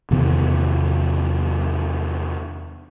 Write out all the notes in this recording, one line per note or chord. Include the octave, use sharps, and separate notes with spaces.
E2 C3 D#3 B3